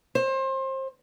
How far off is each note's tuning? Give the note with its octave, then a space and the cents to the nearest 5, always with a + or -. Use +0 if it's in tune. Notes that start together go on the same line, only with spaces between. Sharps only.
C5 +30